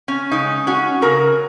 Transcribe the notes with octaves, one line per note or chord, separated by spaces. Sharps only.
C#4
C#3 G#3 C#4 D#4
C#4 F#4
C#3 F#3 C#4 F#4 A#4